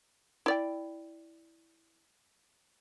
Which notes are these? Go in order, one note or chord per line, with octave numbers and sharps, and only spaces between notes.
E4 D5 G5